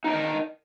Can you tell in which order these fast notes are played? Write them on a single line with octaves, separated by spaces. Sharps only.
D#4 D4 D#5 A#4